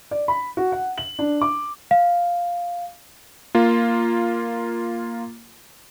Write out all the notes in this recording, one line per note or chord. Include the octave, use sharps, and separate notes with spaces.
D5
B5
F#4
F#5
F#7
D4
D6
F5
A#3 F4